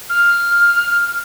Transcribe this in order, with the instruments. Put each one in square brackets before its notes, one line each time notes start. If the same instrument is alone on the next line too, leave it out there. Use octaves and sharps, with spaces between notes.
[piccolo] F6